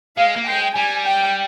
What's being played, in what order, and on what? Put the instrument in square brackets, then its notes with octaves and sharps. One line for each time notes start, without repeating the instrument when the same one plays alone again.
[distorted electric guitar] G#3 [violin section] F5
[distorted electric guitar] A#3
[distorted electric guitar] G#3 [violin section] G5
[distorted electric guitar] G3 [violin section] G#5
[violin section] G5